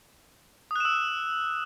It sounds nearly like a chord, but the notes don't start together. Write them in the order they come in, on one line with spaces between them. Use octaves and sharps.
D#6 F#6 E7 E6